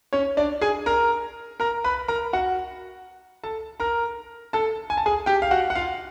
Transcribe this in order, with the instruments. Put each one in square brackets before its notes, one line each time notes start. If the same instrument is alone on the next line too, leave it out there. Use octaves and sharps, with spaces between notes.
[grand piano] C#4 C#5
D4 D5
G#4 G#5
A#4 A#5
A#4 A#5
B4 B5
A#4 A#5
F#4 F#5
A4 A5
A#4 A#5
A4 A5
G#5
A5
G#4 G#5
G4 G5
F5
F#4 F#5
F#5
F4 F5